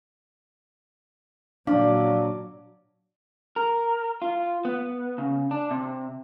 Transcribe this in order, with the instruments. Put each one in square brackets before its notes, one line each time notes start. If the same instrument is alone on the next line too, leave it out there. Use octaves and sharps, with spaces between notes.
[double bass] A#2 F#3 [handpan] D4 [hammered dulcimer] D5 [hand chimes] F5 A5
[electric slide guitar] A#4
F4
B3
C#3
D4
C3